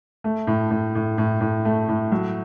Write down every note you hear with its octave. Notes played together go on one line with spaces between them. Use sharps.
A3
A2
A2
A2
A2
A2
A3
A2
F#3